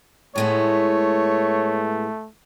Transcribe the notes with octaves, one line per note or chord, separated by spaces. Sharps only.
A2 G#3 A3 B3 C#5